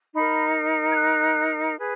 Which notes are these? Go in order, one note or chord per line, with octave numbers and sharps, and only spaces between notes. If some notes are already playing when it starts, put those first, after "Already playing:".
D#4 A#4 B5
G#6
F#6
G#4 B4